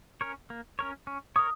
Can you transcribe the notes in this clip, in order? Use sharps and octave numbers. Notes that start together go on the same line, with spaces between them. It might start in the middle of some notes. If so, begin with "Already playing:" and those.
C#4 A#4 C#5
A#3
C#4 A#4 C#5
C#4
A#4 C#5 D#6